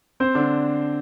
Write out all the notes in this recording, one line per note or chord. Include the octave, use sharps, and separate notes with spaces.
C4 C5
D3 D4